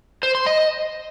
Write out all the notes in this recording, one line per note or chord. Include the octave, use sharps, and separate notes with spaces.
C5
C6
D#5